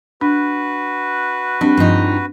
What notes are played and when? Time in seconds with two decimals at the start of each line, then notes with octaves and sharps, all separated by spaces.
0.21 D4 F#4 B4
1.61 G3 C4 D4
1.77 G2 F3 D#4